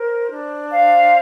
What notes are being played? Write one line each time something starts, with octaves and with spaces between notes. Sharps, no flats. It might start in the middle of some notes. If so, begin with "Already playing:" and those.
Already playing: A#4 C5
D4
C5 F5